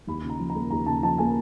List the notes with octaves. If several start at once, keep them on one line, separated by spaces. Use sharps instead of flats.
D#2 B5
C#3
A#5
F3
A#5
A#3
D#2 A#5
C#3 A5
F3 A5
A#3 G#5